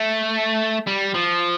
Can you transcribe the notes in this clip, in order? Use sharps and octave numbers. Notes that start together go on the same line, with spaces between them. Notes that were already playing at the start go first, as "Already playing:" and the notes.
Already playing: A3
G3
F3